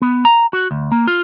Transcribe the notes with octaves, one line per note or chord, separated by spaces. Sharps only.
B3
A#5
F#4
D2
A#3
F4